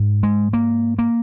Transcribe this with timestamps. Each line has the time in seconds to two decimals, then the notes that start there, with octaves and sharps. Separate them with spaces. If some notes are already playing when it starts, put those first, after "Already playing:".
Already playing: G#2
0.23 G#3
0.53 A#3
0.99 A#3